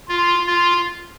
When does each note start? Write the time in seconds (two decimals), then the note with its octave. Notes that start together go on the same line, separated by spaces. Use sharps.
0.08 F4
0.46 F4